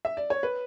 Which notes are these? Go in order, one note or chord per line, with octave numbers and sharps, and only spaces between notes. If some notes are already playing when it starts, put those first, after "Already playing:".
E5
D5
C#5
B4